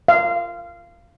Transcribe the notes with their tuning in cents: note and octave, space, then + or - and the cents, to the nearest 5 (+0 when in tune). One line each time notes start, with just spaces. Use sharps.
F5 -20